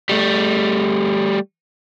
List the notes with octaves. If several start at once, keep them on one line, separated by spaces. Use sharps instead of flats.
G3 A3